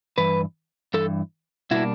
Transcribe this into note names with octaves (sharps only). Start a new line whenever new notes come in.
G2 E3 B4
G2 E3 A4
B2 G3 A#3 D4 E4 F#4